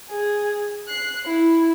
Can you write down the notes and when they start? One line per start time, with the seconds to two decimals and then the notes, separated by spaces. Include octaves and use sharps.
0.10 G#4
0.87 F#6 C7
1.26 E4